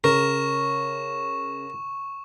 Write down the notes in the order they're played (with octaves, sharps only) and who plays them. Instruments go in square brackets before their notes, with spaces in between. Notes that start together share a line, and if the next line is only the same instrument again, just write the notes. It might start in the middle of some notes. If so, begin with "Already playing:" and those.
[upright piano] C#3 [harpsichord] A#4 [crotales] C#6 E7